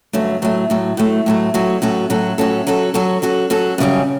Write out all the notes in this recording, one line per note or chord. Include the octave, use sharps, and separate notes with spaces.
G2 D3 F#3 A3 C#4
A2 F#3 A3
A2 F#3 A3
A2 F#3 A3
A2 F#3 A3
A2 F#3 C#4 F#4 A4
A2 F#3 C#4 F#4 A4
A2 F#3 C#4 F#4 A4
A2 F#3 C#4 F#4 A4
F#3 C#4 F#4 A4
F#3 C#4 F#4 A4
F#3 C#4 F#4 A4
F#3 C#4 F#4 A4
F#2 C#3 G3 C#4